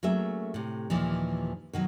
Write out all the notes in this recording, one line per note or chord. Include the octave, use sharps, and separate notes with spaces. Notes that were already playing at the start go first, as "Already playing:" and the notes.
F#3 A3 A#3 C#4 G#4 E5
A2 C3
D#2 A#2 E3 F3
B2 D#3 F#3